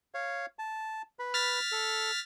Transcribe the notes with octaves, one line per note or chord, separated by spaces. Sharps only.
C#5 F5
A5
B4 B5
F6 A6 B6
A4